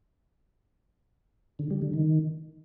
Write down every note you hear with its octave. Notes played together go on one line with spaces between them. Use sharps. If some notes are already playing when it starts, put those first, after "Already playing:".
D3
G3
D3
D#3